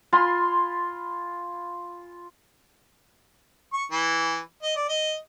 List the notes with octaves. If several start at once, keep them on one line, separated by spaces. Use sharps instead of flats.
F4 G#5 B5 C6
C#6
E3
D#5
D5
D#5